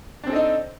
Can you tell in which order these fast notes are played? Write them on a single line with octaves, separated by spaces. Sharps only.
D4 C4 A4 D#5 D#4